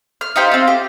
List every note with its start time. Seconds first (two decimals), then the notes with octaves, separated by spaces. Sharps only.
0.21 F6
0.36 D#4 F4 G4 C5
0.51 C4 F4
0.67 G4